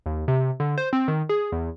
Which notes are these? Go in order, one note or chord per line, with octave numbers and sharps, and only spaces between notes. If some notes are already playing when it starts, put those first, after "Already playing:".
D#2
C3
D3
C5
C4
D#3
G#4
E2